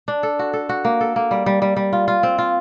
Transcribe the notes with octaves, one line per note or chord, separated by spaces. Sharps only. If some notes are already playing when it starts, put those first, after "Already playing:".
D4
A4
F#4
A4
F#4
A#3
A4
A#3
G3
G3
G3
G3
F4
F4
C4
F4